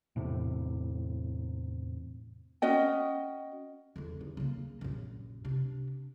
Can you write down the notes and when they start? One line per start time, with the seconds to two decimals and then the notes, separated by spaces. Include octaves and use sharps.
0.16 E2 A2 C3
2.62 C#4 F#4 D#5 G5
3.96 E2 D3
4.21 E2
4.37 C#3 A#3
4.81 A#1 F#2
5.45 C3 D4